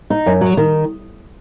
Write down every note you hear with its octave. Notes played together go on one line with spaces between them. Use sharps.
D#4
F#2
F#3
D#3